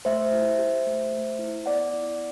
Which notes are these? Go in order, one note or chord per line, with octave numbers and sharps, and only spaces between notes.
A3 C5 E5
E4
G4
A3
A3
E4
B3 D5 F#5
E4